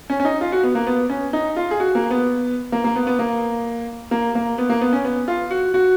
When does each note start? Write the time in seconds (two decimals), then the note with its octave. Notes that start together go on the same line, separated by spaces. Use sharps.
0.10 C#4
0.20 C#4
0.25 D#4
0.41 F4
0.52 F#4
0.63 B3
0.75 A#3
0.87 B3
1.10 C#4
1.33 D#4
1.56 F4
1.71 G#4
1.80 F#4
1.95 A#3
2.10 B3
2.72 A#3
2.84 A#3
2.96 B3
3.07 B3
3.19 A#3
4.11 A#3
4.35 A#3
4.58 B3
4.70 A#3
4.81 B3
4.93 C#4
5.04 B3
5.28 F4
5.51 F#4
5.74 F#4